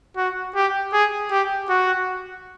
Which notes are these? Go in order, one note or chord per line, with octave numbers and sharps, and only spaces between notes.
F#4
G4
G#4
G4
F#4